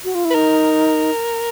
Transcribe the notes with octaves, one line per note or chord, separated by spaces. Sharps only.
F#4
F4
E4
B4
D#4 A#4